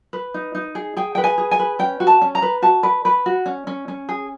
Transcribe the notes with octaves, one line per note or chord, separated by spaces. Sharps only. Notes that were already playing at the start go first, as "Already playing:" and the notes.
B4
D#4
D#4
G#4
G#4 G5
B4 G5
G#5
G#4
G#5
B4
C#4 G5
F#4
A5
C#4
A#5
B4
F#4 A5
B4
B4
F#4
C#4
C#4
C#4
G#4